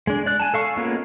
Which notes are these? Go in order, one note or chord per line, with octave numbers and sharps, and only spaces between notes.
G#3 D4
D5 F#6
G#5 A5
A4 F5 C#6
G#3 A#3 B3 C#4 F4